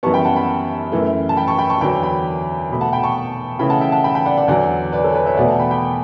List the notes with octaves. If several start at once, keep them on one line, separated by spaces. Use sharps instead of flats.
F#2 E3 G3 B3 A5 C#6
G5 B5
F#5 A5
G5 B5
F#2 E3 A3
A5
G5 B5
A5 C#6
G5 B5
A5 C#6
E2 D3 F#3 G5 B5
G5 B5
B2 A3 B5
F#5 A5
G5 B5
A5 C#6
C#3 E3 A3 G5 B5
F#5 A5
E5 G5
F#5 A5
G5 B5
G5 B5
D5 F#5
D5 F#5
E2 D3 F#3 D5 F#5
B4 D5
A4 C#5
B4 D5
C#5 E5
E2 B2 A3 D5 F#5
F#5 A5
G5 B5
G5 B5